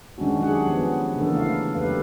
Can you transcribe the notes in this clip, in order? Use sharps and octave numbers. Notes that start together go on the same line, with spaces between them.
D#3 G#3 C#4 D4 F#4
F#3 D4 G4 G#4 F#5
F3 B3
C#3 E3 A#3 D4 A4 A#4
A3 E4 F5
F#3 G4 A4 B4 F5